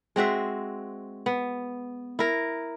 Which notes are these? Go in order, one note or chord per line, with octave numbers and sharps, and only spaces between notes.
G#3 C4 F#4 E5
B3
E4 A#4